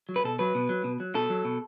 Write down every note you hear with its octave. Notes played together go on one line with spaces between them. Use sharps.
F#3
B4
B2 A4
F#3 B4
B2
F#3
B2
F#3
B2 A4
F#3
B2